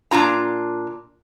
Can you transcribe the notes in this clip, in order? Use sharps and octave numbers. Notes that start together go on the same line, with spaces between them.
A#2 D4 F4 A#5